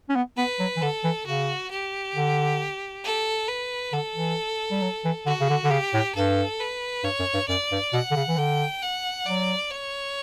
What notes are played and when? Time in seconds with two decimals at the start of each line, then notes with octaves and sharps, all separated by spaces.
0.09 C#4
0.15 B3
0.37 B3 B4
0.59 F#3
0.76 E3
0.82 D3 A4
1.04 E3
1.26 C#3 F#4
1.71 G4
2.15 D3
3.04 A4
3.48 B4
3.92 D3 A4
4.15 E3
4.71 G3
4.82 F#3
5.05 E3
5.26 D3 F#4
5.40 C#3
5.49 D3
5.64 D3
5.70 C#3 G4
5.94 A2
6.15 G2 A4
6.60 B4
7.04 G2 C#5
7.19 F#2
7.34 G2
7.48 F#2 D5
7.71 G2
7.93 B2 F#5
8.11 D3
8.16 C#3
8.28 E3
8.38 D3 G5
8.82 F#5
9.26 F#3 D5
9.71 C#5